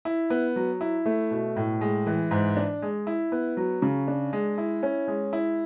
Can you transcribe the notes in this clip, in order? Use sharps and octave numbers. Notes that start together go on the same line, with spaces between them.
E4
B3
F#3
E4
A3
B2
A2
G#3
E3
G#2
D4
G#3
E4
B3
F#3
C#3
D4
G#3
E4
C#4
G#3
E4